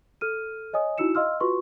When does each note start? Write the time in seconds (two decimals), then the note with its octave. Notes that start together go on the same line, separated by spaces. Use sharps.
0.21 A4 F6 D#7
0.73 C#5 D#5 G#5 D#6
0.98 D#4 E4 F#4 E6 C#7 E7
1.15 D#5 F5 C6 E6 F6
1.40 F4 F#4 B4 C6 C#6